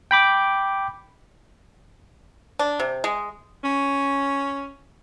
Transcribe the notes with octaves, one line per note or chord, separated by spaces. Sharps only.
G5 B5 D6
D4
C3
G#3
C#4